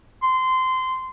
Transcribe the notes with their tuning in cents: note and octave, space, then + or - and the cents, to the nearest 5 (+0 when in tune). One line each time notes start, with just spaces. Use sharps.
C6 -20